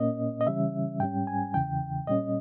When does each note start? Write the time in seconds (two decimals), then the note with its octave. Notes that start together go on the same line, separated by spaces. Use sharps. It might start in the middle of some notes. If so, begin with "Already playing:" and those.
Already playing: A#2 A#3 C#4 D#5
0.41 D#5
0.47 C#3 E3 G3 C#4 E5
1.00 G#2 G3 C#4 G5
1.27 G#5
1.54 E2 C#3 E3 G5
2.07 A#2 G3 C#4 D#5